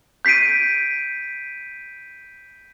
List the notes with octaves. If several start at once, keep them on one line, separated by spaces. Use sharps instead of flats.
G6 B6 C7 D7 D#7